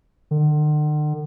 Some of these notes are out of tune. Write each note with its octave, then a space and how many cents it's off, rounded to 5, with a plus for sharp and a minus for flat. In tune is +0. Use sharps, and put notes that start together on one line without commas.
D3 +45